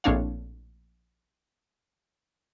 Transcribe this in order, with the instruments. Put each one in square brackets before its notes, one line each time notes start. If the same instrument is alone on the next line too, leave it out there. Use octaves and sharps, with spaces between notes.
[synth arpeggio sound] A#1 A2 C4 D4 C#5 F5